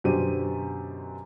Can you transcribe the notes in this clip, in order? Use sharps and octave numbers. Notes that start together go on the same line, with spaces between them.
F#2 B2 D3 G4 C5 D#7